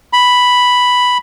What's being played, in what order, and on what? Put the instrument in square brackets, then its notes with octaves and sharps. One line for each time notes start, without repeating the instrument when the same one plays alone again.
[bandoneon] B5